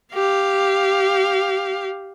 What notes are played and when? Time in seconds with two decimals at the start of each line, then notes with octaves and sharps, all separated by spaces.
0.14 G4 F5